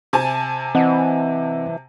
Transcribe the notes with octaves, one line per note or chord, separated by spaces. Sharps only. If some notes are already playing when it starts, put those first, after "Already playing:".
C3 G#5 A5
E3 C4 D#5 F#5